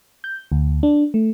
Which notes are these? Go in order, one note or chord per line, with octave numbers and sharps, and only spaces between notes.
G6
D2
D4
A3